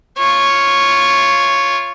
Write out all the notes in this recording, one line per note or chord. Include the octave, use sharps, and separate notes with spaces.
F4 C#5